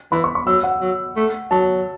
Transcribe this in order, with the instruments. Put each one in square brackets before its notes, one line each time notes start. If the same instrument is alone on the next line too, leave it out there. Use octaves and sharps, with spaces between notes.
[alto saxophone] E3 [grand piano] B5
[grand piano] C#6
C#6
[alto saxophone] F#3 [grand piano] E6
[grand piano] F#5
[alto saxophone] F#3
A3
[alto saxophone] F#3 [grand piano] A5